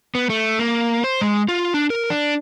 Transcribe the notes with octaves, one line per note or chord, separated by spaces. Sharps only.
B3
A3
A#3
C5
G#3
F4
D4
A#4
D4